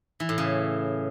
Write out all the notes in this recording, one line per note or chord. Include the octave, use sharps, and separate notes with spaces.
E3
A2
C#3